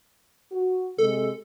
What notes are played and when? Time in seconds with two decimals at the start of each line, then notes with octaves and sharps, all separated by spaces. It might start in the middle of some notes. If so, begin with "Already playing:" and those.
0.52 F#4
0.98 C3 G#3 A4